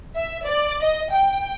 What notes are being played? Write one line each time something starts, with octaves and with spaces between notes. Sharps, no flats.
E5
D5
D#5
G5